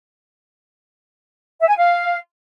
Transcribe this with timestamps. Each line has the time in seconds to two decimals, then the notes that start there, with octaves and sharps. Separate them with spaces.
1.60 E5
1.68 G#5
1.76 F5